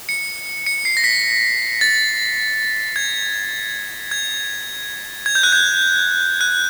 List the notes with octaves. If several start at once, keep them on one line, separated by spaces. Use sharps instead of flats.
C#7
C#7
C7
A#6
B6
A6
G#6
G#6
G#6
G6
F#6
G6
F#6